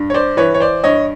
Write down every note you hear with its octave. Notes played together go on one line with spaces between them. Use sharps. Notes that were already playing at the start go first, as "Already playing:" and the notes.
Already playing: G2
C#5
C5 D5
E3 B4 C#5
C#5
C5 D5
G2 C#5 D#5